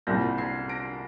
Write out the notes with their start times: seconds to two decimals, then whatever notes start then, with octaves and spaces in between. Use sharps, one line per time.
0.07 C2 A#2 G3 G6 A#6
0.38 G#6 C7
0.69 A#6 D7